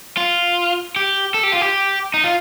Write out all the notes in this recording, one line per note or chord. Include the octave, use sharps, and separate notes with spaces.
F4
G4
A4
G4
F4
G4
D#4
F4